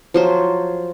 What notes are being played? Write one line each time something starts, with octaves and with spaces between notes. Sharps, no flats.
F3 F#3 C5